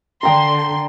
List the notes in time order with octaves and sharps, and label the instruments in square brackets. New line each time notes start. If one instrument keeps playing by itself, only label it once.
[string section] D3 C6 [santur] G5 A#5